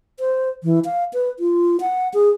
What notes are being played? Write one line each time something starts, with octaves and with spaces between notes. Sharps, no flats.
C5
E3
F5
B4
F4
F#5
G#4